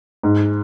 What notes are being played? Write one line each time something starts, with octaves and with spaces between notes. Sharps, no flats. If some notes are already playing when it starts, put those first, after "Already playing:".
G#2